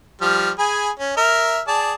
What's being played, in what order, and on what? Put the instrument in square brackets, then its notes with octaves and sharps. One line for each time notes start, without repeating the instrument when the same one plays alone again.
[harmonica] F3 G3 F6
G#4 G#5 B5
C#4
A#4 E5 F6
G#4 D5 A5